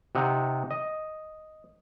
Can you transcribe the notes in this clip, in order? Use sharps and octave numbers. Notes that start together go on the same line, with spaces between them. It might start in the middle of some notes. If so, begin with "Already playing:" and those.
C3 D#4 F#5
D#5